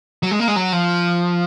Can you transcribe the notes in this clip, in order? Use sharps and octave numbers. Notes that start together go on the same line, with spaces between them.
F#3
G#3
A#3
G#3
F#3
F3